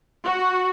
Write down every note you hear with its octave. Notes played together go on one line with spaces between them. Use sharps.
F#4